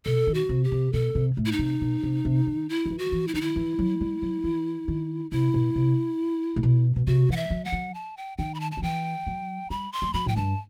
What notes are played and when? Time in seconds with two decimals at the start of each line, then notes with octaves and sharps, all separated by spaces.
0.05 B2 A4
0.27 D#3
0.34 F#4
0.49 C3
0.64 G4
0.72 C3
0.93 B2 A4
1.15 C3
1.37 A2
1.46 E4
1.52 D#4
1.59 C3
1.81 B2
2.03 C3
2.25 C3
2.47 D#3
2.69 E4
2.86 D#3
2.91 E3
2.98 F#4
3.12 E3
3.28 E4
3.34 D#3 D#4
3.41 E4
3.56 E3
3.79 F#3
4.01 G3
4.22 F#3
4.44 E3
4.88 D#3
5.31 C3 E4
5.54 B2
5.75 C3
6.56 A2
6.63 B2
6.96 B2
7.07 C3 F#4
7.29 E3 F#5
7.36 E5
7.50 F#3
7.65 F#5
7.72 F#3
7.94 A5
8.17 G5
8.38 D#3 G5
8.54 B5
8.60 A5
8.72 A5
8.77 F#3
8.82 E3 G5
9.27 F#3
9.70 G3 B5
9.92 C6
10.02 G3
10.14 F#3 B5
10.26 A2 G5
10.36 G2 A5